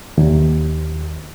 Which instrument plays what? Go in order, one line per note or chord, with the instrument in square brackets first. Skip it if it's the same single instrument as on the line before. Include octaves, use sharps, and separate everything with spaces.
[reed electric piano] D#2